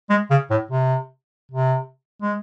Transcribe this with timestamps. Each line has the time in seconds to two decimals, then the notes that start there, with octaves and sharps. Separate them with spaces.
0.10 G#3
0.31 C#3
0.50 A2
0.71 C3
1.52 C3
2.22 G#3